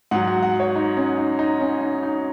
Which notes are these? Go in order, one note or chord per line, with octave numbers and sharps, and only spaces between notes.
G#2 F#3 F#5
F#5
F#5
C#5
D#4
C#4
D#4
D#4
C#4
D#4
D#4